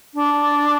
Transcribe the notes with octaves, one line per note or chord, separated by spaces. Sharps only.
D4